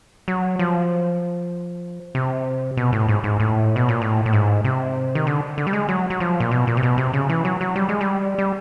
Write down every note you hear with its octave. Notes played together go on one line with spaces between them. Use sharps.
F#3
F3
C3
B2
A2
G#2
G#2
A2
B2
A#2
A2
A2
G#2
C3
D#3
D3
D3
G3
G#3
F#3
F#3
F3
A#2
B2
A#2
C3
B2
C3
C#3
E3
F#3
F#3
G3
G#3
G3
G3